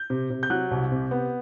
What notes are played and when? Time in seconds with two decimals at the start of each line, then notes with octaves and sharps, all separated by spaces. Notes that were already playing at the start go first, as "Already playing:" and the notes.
Already playing: G6
0.10 C3
0.30 C3
0.43 G6
0.50 F#3 F#6
0.71 C2
0.92 C3
1.11 B3